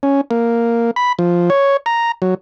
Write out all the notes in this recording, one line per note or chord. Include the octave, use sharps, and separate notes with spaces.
C#4
A#3
B5
F3
C#5
A#5
F#3